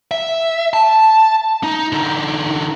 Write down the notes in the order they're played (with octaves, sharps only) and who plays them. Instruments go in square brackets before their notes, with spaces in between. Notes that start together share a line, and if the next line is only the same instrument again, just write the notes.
[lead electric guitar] E5
A5
D#4
D3 D#4